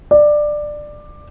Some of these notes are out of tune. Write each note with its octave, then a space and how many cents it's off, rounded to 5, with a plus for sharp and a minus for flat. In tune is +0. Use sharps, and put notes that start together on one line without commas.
D5 +15